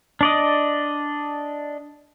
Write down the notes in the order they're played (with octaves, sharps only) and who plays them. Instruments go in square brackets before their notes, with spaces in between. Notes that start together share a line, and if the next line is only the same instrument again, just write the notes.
[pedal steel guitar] D4 D5 D#5